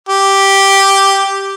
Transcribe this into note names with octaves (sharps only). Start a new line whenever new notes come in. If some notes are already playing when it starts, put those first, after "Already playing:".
G4